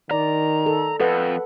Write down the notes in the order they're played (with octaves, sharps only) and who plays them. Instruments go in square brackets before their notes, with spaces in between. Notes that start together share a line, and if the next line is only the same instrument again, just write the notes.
[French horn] D#3 [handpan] D5 [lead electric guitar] A#5
[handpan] A4
[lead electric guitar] F2 [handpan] A4 B4 F#5